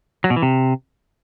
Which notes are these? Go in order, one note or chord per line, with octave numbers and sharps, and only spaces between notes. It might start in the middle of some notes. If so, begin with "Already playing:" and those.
F#3
B2
E3
C3